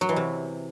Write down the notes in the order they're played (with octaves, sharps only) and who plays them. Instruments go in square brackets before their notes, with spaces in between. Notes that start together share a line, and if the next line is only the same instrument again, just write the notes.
[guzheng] F#3
E3
C3